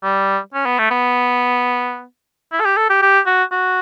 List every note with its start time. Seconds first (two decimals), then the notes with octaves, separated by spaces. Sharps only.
0.04 G3
0.54 C#4
0.66 B3
0.79 A3
0.91 B3
2.52 E4
2.60 A4
2.66 G4
2.77 A4
2.90 G4
3.02 G4
3.26 F#4
3.52 F#4